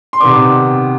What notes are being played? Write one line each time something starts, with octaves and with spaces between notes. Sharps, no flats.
C6
C3 D#3 B3 D4 D6